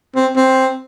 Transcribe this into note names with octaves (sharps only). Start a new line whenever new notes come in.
C4
C4